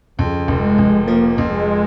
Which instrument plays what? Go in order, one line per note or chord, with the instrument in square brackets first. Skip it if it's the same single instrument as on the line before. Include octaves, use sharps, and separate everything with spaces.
[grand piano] F2 [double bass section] C#3
[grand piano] F1
[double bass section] G#3
[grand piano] F1
[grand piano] F3 [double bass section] A#3
[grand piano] F2
[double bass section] G#3